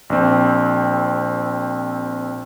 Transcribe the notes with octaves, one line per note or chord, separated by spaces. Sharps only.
A#1 C4